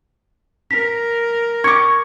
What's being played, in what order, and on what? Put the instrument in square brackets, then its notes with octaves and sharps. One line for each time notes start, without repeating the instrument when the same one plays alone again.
[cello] A#4 [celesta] B6
[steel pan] C#6 D6 [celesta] G#6